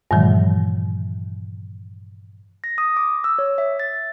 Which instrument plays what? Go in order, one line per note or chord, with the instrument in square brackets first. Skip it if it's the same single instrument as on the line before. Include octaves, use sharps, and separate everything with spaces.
[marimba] G2 A#2 D#3 E3 F#3 G#3
[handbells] A#6
D#6
D6
E6
C#5
E5
A6